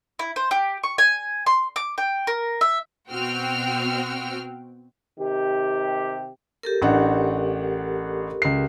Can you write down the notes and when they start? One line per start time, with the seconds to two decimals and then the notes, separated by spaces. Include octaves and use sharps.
0.19 E4
0.36 C5
0.51 G4
0.83 C#6
0.98 G#5
1.46 C6
1.76 D6
1.98 G5
2.27 A#4
2.61 E5
3.11 B2 C4 F#4 G5 F6
5.19 C3 D#3 G4
6.63 G4 A4 A#4
6.82 A1 D4 F#5
8.42 C#2 C7